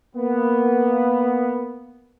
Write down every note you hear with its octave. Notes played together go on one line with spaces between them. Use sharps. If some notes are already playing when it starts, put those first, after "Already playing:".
A#3 B3